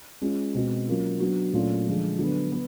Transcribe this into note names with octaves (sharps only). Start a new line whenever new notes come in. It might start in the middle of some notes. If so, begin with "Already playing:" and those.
G#3 C#4 F4
B2 G#3 C4
F#3 A#3 C#4 F4
F#3 B3 D4 F#4
A#2 F#3 A3 C#4 F4
D3 F3 G#3
D3 F#3 B3
B3